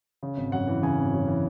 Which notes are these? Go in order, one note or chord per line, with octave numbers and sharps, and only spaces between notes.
C#3
G#1
F#2 F#5
E3
C#3 G#5
G#1
F#2
E3